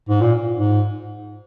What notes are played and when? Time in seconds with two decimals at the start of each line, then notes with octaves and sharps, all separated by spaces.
0.09 G#2
0.21 A#2
0.57 G#2